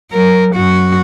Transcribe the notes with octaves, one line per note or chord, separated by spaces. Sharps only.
F#3 A#4
F#2 F#4